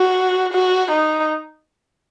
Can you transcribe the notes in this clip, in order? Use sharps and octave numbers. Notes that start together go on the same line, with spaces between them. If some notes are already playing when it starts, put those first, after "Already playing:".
Already playing: F#4
F#4
D#4